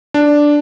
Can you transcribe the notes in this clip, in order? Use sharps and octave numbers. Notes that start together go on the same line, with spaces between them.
D4